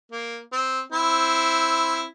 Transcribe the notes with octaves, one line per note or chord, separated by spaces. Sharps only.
A#3
C4
C4 E4